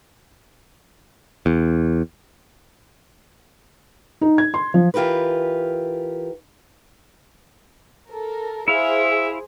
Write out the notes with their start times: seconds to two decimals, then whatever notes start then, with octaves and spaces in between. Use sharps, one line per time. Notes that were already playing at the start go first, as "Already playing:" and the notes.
1.46 E2
4.21 D#4
4.38 G#6
4.54 C6
4.74 F3
4.94 E3 F4 G4 A#4 B4
8.09 A4 A#4
8.68 E4 G#4 C5 E5 F5